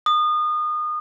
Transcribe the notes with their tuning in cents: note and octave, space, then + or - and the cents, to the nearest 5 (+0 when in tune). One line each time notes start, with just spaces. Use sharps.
D#6 -30